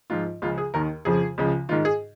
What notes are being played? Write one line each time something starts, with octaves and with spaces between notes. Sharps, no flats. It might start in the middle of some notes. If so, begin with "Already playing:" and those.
G#2 F3 F4
C#2 C#3 F3 F4
G#4
D#2 D#3 A#4
F2 C#3 F3 G#4
C#2 C#3 F3
G#2 D#3 F4
G#4